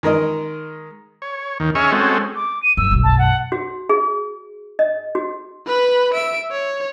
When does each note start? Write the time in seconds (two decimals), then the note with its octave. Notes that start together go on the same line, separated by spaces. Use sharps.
0.03 D#3 G#3 A#4 D#5
1.22 C#5
1.60 D#2 D#3
1.75 C#4 G#4 D#5 E5 C#6 F6
1.92 G#3 C4 C#4 F#4 A4
2.35 D6
2.63 D#7
2.77 F#2 E6
2.91 B1 F#2
3.03 A5
3.18 F#5
3.52 F#4
3.89 G#4
4.79 D#5
5.15 F#4
5.66 B4 B5
6.14 E5 D7
6.51 C#5